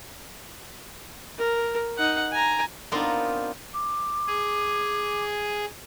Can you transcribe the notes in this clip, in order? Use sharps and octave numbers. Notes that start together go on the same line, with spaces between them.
A#4
D#4 F#5
G#5 A#5
B3 C4 D4 D#4 F4 A#4
D6
G#4